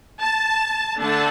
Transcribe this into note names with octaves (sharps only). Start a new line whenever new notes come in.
A5
D3 A3 D4 A5